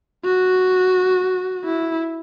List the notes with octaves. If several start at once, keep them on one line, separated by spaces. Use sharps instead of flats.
F#4
E4